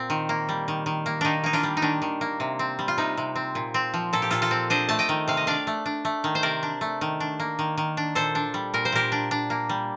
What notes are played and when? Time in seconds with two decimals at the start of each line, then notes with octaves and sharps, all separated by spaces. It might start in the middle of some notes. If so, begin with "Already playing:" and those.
Already playing: A#2 C4
0.10 D#3
0.29 A#3
0.49 G3
0.68 D#3
0.86 D#3
1.06 A#3
1.21 D#3 D4 D#4
1.44 A#3 D#4
1.53 D4 F4
1.63 G3
1.77 D#4
1.82 D#3 D4
2.02 D#3
2.21 A#3
2.40 C3
2.59 C4
2.79 G3
2.88 F4
2.98 C3 D#4
3.17 C3
3.35 C4
3.55 A#2
3.74 C4
3.94 F3
4.13 A#2 A4
4.22 G4
4.31 A#2 F4 A4
4.42 F4 A4
4.51 C4
4.70 D4 C5 D#5
4.89 A3 A5
4.99 D#5 G5
5.09 D#3
5.28 C3 F5
5.37 D#5
5.47 D4 D5 F5
5.67 A3
5.86 D4
6.05 A3
6.24 D#3
6.35 C5
6.43 C3 A#4 D5
6.63 D4
6.81 A3
7.01 D#3
7.20 D4
7.40 A#3
7.59 D#3
7.78 D#3
7.97 D4
8.15 A#2 A4 C5
8.35 D4
8.54 G3
8.74 A#2 A#4
8.85 C5
8.92 A#2 G4 A#4
9.12 D4
9.31 D4
9.50 A#3
9.69 G3